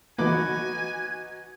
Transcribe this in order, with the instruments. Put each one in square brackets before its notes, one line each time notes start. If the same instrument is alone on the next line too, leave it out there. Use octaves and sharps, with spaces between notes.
[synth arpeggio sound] E3 A3 A#3 [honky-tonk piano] D#4 F#4 [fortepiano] B4 D6 [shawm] G#5